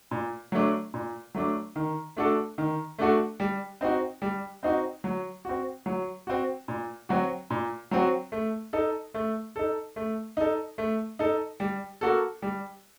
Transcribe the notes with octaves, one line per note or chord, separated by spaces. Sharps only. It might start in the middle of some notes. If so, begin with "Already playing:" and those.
A#2
F#3 A3 D4
A#2
F#3 A3 D4
D#3
A3 D4 F#4 A4
D#3
A3 D4 F#4 A4
G3
C4 D#4 F#4
G3
C4 D#4 F#4
F#3
C4 F#4
F#3
C4 F#4
A#2
F#3 C4 F#4
A#2
F#3 C4 F#4
A3
D#4 A4
A3
D#4 A4
A3
D#4 A4
A3
D#4 A4
G3
A#3 F#4 A4
G3